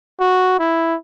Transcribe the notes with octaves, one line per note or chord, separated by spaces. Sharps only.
F#4
E4